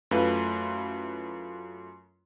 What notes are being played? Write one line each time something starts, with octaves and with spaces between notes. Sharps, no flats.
F#2 A3 E4 F4 B4